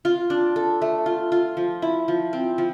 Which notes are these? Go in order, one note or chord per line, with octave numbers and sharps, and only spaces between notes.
F4
D4
A4
A3
F4
F4
F3
E4
F3
C4
F3